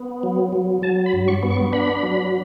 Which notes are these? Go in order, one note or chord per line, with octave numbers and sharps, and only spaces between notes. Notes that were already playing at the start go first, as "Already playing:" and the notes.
Already playing: B3
F#3
F#3
F#3 A5
B5
G2
C#6
B3
C#6
D4 B5
F#3